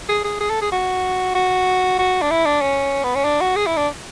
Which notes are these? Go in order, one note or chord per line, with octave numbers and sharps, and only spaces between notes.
G#4
G#4
G#4
A4
G#4
F#4
F#4
F#4
D4
E4
D4
C#4
B3
C#4
D4
F#4
G#4
E4
D4